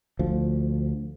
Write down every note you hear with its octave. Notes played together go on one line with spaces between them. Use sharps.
D2 F3